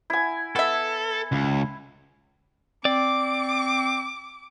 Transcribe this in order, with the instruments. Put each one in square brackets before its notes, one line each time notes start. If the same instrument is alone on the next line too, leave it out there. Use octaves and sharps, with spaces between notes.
[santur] E4 G#5
[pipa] B3 E5 [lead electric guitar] A4
[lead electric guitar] C#2
[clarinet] C4 [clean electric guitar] D5 [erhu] D6